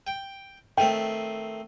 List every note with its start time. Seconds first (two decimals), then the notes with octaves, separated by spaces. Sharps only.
0.07 G5
0.78 D#3 A3 C4 G5